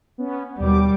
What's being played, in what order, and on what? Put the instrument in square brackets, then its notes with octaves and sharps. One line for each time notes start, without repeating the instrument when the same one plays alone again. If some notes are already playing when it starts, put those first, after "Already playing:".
[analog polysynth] B3 C#4
[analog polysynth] D#2 B2 D6 [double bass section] G3